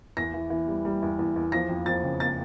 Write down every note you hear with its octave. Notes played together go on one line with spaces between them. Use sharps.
E2 A#6
E3
E3
G3
G3
E2
E2
E2
F3 A#6
F2
F2 A6
C#3
A6